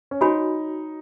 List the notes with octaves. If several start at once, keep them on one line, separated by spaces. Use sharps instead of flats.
C#4
D#4 F#4 C#5 G#5 B5